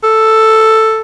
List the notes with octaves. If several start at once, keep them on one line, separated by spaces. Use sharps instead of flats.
A4